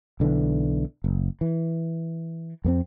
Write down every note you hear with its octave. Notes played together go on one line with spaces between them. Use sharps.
B1 D3 E3
F#1
E3
F2 A#3 C4